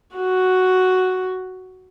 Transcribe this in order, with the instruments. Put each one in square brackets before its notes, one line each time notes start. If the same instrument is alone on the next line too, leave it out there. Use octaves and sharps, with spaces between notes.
[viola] F#4